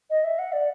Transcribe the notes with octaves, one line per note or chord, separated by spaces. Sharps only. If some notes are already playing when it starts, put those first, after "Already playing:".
D#5
E5
F#5
D5